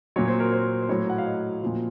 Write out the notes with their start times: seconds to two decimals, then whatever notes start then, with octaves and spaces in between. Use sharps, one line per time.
0.16 A#2 F#3 C#5
0.28 C5
0.40 A#4
0.52 C5
0.83 C5
0.89 A2 F#3 C#5
1.10 F#5
1.18 F5
1.26 D#5
1.62 A#2 F3